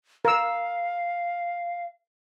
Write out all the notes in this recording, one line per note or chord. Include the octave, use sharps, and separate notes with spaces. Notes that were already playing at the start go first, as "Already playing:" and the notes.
A#4 F5 E6